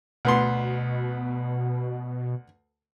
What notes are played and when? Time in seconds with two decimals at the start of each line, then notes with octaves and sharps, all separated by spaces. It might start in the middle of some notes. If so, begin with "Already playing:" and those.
0.25 D2 B2 B3 C6